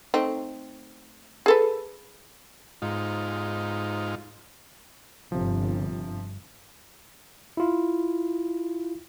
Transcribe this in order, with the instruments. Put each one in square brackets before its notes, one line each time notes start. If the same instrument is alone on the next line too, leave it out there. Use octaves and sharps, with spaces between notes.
[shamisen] A3 C4 D#4
G#4 A4 B4
[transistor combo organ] G#2 D#4 F4
[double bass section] G1 [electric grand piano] C3 F3
[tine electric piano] E4 F4